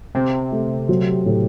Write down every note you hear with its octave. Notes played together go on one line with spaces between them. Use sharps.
C3 C4
A3
F#3
A2